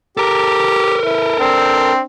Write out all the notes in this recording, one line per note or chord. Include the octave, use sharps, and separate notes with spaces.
G4 A4 A#4
E4
C4 D4